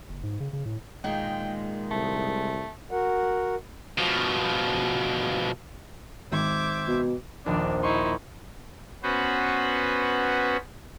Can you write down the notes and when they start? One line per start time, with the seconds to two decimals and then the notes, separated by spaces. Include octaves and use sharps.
0.09 F#1
0.23 G#2
0.40 C#3
0.53 C#3
0.65 A2
1.04 A#2 D#3 G#3 A#3 G5
1.91 C2 A3
2.91 F#4 A#4 F#5
3.98 B2 F3
6.32 G#1 C5 E5 D6 G#6
6.87 B2
7.46 A#1 D#2 D4
7.83 D#4 E4 C6 C#6
9.03 B3 C#4 F#4 B4 C5